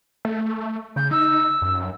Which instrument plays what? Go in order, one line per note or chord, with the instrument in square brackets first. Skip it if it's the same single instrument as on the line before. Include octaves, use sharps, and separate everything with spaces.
[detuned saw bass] A3
[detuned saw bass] C#3 [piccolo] G6
[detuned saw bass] D#4 [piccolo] E6
[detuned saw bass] F#2